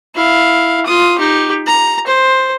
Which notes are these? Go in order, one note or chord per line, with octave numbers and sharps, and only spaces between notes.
E4 F5
F4 D#6
D#4 G4
A#5
C5